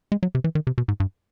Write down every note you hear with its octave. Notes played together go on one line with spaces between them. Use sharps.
G#3
F#3
C3
E3
D#3
C3
B2
G#2
G2